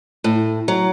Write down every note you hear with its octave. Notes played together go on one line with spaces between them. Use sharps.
A2
F#3